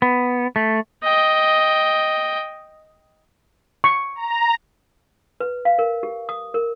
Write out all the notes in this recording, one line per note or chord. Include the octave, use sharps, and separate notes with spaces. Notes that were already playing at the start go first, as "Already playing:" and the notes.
B3
A3
D#5 G5
C#6
A#5
B4
F5
A#4
G4
D#6
A#4